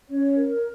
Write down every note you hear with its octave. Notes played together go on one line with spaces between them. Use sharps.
C#4 C#5
A#4